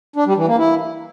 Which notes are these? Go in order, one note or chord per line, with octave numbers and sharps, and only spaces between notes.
D4
G3
E3
A#3
E4